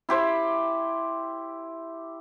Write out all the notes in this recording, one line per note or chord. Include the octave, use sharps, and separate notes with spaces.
E4 G4 C5